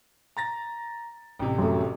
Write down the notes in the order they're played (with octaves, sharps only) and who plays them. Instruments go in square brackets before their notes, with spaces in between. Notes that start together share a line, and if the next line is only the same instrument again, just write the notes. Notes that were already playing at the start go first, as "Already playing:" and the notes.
[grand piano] A#5 A6 A#6
A1 C3
[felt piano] F#2 A3